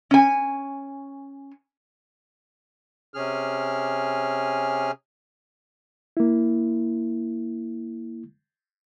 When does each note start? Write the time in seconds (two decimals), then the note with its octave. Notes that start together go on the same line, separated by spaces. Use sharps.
0.11 C#4 G#5
3.14 C3 C#4 G#4 F6
6.17 A#3 E4